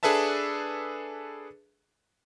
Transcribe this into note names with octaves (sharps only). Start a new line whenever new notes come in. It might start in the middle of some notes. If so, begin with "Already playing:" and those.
D4 G#4 A4 B4 E5 A5